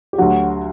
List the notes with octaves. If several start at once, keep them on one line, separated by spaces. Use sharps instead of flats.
G4
D2 D3 F#3 F#4